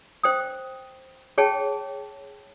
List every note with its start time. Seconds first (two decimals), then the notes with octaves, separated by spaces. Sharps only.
0.23 C5 G5 D#6
1.38 G#4 C#5 G5 A5